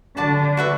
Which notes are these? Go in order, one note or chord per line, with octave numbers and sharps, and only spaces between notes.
D3 F#4 D5 A5
F#4 B4 E5